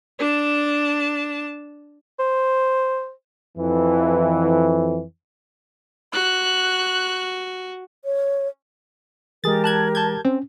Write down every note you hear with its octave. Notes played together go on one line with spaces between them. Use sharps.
D4 A5
C5
F2 E3
F#4 F#6
C#5
E3 G#3 G4 G#4 A#4 A6
A5 F#6 G#6
A5 G6 G#6
C4 C#4